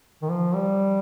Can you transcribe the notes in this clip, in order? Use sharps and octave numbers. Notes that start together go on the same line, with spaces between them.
D#3
F3
G3